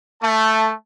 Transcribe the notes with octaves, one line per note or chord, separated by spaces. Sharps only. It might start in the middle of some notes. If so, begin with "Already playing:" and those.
A3 A5